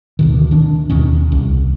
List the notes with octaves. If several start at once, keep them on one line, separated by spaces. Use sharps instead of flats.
D2 B2 D#3
D#3 D4
D#2 B2 D#3 C#4
C2